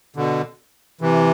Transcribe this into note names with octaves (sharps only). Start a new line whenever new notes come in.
B2 D3
C3 E3